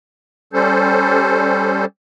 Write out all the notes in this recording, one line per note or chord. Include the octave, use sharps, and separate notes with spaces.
G3 C#4 A4 C5